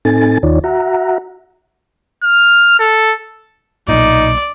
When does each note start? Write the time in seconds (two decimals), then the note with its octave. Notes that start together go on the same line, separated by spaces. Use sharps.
0.05 A2 C4 D#4 A4 G#5 A6
0.43 D#2 D#3 D#4 F4 C#5 D5
0.64 F#4 E5 F#5 A#5
2.23 F6
2.79 A4
3.89 B1 A#2 D#4 D5